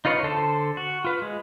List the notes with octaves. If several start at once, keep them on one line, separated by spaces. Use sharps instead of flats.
D#4 F4 B4 C#5
D3 A4 C5 A5
F#4
F4 B4
G#3